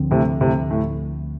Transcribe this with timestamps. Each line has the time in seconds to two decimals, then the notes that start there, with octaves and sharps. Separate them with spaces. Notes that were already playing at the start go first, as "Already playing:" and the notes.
Already playing: D2 D3 F3 C4
0.11 A2 C3
0.41 A2 C3
0.71 A2